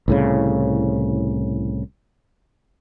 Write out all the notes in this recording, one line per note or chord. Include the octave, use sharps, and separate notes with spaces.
C2 A2 C#3